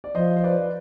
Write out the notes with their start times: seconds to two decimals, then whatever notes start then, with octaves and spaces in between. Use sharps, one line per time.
0.04 D5
0.15 F3 C5 D#5
0.37 C5
0.44 B4 D5